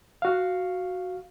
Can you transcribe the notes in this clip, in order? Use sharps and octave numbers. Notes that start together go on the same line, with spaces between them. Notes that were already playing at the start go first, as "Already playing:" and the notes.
F#4 F5